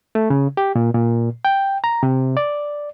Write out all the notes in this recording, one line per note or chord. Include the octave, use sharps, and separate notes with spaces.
A3
C#3
G4
A#2
A#2
G5
A#5
C3
D5